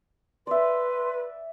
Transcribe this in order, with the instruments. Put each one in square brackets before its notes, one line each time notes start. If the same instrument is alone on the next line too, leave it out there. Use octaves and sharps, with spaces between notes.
[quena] B4 [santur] D5 E5 [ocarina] C6